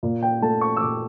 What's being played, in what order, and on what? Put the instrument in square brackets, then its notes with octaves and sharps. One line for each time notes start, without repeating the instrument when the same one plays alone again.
[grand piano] A#2
G5
A3 A5
C#6
E6
A#2 D6